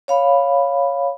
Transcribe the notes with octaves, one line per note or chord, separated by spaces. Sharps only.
C#5 F5 B5